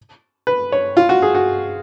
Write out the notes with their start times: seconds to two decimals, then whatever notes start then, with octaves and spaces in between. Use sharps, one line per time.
0.47 B4
0.72 C#5
0.97 F4
1.09 F#4
1.22 G#4
1.35 F#4